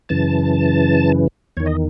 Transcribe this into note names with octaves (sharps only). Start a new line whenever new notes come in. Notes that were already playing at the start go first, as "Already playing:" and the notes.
F#2 C#3 E3 A5
E2 D#3 C#5
D#5